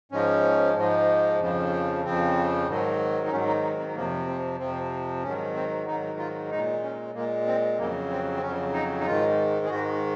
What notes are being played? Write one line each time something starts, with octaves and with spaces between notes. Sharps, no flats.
G#2 F3 G#3 C#4
G#2 F3 G#3
F2 C#3 F3
F2 C#3 F3 C4
G#2 D#3 F#3
D#4
G#2 D#3 F#3 C#4
D#4
D#4
C4
F2 C3 F3 A#3
C4
F2 C3 F3 C4
G#2 D#3 F#3 C#4
C4
G#2 D#3 F#3 D#4
F4
A#2 G#3 D#4
C#4
A#2 G#3 A#3
C4
F2 C#3 F#3 A#3
C4
C4
F2 C#3 F#3 C#4
D#4
D#4
G#2 D#3 G#3 F4
G#4
G#2 D#3 G#3 F#4